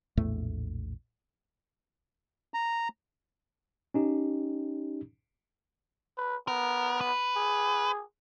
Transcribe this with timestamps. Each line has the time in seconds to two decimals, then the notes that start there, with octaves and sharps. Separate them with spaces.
0.17 A#1 E2 A2 A3
2.54 A#5
3.94 C#4 D#4 G4
6.18 B4
6.48 B3 A#4
7.01 B4
7.36 G#4